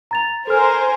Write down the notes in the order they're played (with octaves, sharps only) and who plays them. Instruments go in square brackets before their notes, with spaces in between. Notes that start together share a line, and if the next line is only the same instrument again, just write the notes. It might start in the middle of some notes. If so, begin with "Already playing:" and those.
[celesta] A#5 A6 F7
[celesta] A4 F6 [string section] A#4 C5 G#5